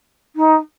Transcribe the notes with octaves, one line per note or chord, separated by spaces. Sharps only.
D#4